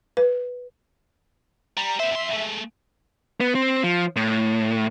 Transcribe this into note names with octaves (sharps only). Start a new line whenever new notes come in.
B4
G3 A#5
B3 C5 E5
F2 C6
G#3 A3
B3
C4
F3
A2